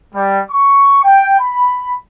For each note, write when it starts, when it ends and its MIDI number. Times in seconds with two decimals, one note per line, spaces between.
0.15 0.41 55
0.51 1.00 85
1.04 1.39 79
1.40 1.96 83